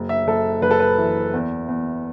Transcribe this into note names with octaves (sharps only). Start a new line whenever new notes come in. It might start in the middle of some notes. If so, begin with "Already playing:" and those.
Already playing: F#1
E5
F#1 A4
F#1 B4
A4
B4
E3
E2
E2